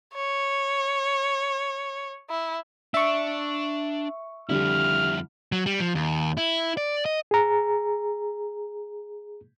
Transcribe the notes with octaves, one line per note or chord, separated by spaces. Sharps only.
C#5
E4
D4 E5 C#6
F2 D3 G3 E4 F6
F#3
G3
F3
D#2
E4
D5
D#5
G#4 A#5